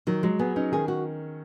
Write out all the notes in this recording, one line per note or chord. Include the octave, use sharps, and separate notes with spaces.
D#3 F#3
F#3 G#3
B3 G#4
C#4 D#4
D#3 G#4
F#4